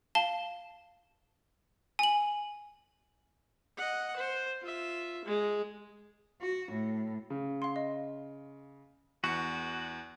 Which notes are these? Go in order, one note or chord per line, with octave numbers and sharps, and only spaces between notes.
F5 A5 G7
G#5 F#7
D#5 F#5
C5
F4 E5
G#3
F#4
A2
C#3
F5 C6
D#5
E2 F#4 C#7